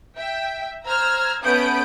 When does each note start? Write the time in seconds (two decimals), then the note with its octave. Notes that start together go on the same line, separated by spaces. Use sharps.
0.17 E5 G5
0.85 C5 A#5 E6 F6 G#6
1.43 A3 B3 C#4 D#6 G6 D7